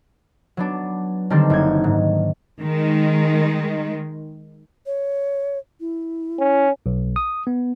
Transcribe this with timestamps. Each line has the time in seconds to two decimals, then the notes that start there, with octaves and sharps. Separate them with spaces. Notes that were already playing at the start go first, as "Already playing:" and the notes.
0.57 F#3 B3 D4
1.30 D3 D#3 G3 C4 D4 A4
1.50 F#1 A#3 G6 G#6
1.84 G#2
2.60 D#3 G#3
4.86 C#5
5.80 E4
6.39 C#4
6.86 B1
7.16 D#6
7.47 B3